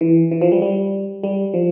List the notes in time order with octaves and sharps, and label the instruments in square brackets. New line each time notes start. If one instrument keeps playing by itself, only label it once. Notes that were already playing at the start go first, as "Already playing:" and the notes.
[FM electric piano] E3
E3
F3
G3
G3
G3
F3